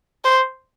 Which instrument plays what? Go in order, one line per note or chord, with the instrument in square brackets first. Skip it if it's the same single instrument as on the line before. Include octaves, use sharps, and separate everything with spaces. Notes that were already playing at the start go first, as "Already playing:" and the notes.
[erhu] C5